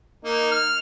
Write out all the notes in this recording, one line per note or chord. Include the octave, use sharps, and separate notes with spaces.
A#3 D#4
F6